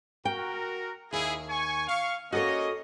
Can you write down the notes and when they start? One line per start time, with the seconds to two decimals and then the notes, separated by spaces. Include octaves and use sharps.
0.25 F#4 A#4 G5
1.13 D#2 E4 G#4
1.49 G#5 C#6
1.88 F5 C#6
2.32 A#3 C#4 F#4 A4 C#5 D#5